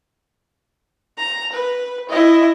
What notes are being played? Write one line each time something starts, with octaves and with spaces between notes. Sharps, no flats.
A#5
B4
E4 D#5